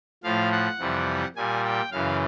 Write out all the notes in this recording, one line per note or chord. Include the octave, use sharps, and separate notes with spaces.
A2 F3 F5
F#5
F2 C3 E3 G3
A#2 G3 G#5
G5
F#2 C#3 E3 F5